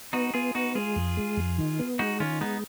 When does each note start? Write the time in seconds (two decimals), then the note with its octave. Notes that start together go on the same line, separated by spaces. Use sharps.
0.13 B3 D#4 F#4
0.34 B3 F4 G#4
0.55 B3 D#4 F#4
0.75 G#3 F4 G#4
0.96 F2
1.17 G#3
1.37 F2
1.58 D#3
1.79 B3
1.99 G#3 D#4 F#4
2.20 D#3 C#4 F4
2.41 G#3 B3 D#4